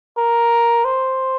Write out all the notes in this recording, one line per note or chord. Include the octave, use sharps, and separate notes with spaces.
A#4
C5